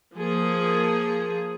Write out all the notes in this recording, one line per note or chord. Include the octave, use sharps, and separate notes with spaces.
F3 A#3 G#4